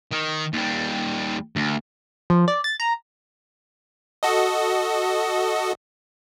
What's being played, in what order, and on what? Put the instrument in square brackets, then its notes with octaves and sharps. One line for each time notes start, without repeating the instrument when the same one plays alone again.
[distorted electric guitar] D#3
D#2 G3
D2
[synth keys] F3
D5
A6
A#5
[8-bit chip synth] F#4 A4 D#5